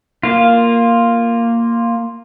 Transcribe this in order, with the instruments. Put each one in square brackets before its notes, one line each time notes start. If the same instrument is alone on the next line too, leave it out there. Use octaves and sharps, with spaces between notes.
[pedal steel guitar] A#3 F4